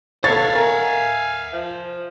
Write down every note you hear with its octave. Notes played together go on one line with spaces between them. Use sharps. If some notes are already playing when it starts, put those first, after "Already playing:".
B3 A4 C#5 E5 F5 A6
A#4 G#5
F3